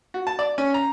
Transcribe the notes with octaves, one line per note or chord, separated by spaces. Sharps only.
F#4
A5
D5
C#4
A#5